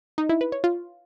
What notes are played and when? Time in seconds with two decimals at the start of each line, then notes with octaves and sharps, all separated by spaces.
0.18 D#4
0.29 E4
0.41 B4
0.52 C#5
0.64 F4